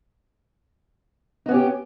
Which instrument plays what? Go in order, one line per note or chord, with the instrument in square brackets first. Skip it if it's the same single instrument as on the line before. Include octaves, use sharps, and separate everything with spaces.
[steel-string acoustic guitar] D#4
B3
C#4
G4